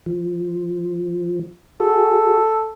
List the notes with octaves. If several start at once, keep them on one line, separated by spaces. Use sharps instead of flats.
F3
F#4 G#4 A4